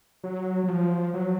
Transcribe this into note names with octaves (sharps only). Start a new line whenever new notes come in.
F#3
F#3
F3
F#3